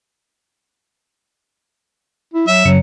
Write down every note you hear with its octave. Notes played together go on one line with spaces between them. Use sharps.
E4
F#3 E5
F#2 C#3 F#3 C#7